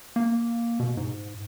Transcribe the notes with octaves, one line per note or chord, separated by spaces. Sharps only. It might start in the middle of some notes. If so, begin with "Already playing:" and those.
A#3
B2
G#2